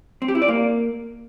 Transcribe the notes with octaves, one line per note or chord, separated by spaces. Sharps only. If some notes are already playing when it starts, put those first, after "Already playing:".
C4
G4
E4
D5
A#3